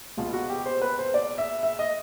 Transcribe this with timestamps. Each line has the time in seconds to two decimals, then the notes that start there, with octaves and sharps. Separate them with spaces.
0.17 C#2 B2 F4
0.33 F#4
0.50 G4
0.66 C5
0.82 B4
0.99 C5
1.14 D5
1.38 E5
1.63 E5
1.79 D#5